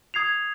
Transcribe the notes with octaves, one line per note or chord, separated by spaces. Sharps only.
D#6 G#6 C7 F7